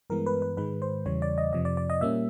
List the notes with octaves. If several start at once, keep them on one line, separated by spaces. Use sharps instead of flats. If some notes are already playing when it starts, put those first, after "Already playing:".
G2 E3 G#3 B3 A#4
B4
B4
G#2 D#3 G#3 B4
C5
E2 C#3 E3 G3 C#5
D5
D#5
F2 C3 F3 D#5
D5
D5
D#5
A#2 G3 A#3 C#4 E5